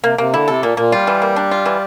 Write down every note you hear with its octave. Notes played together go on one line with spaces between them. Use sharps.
C3 A#3
C3 A#3
D3 E4
C3 A4
A#2 A#3
A#2 A#3
G3 F4
E3
A#3
D4
F4
E3